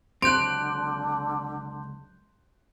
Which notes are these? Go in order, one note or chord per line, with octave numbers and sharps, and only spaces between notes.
C#2 D3 F#3 C4 C6 F#6 G6 D7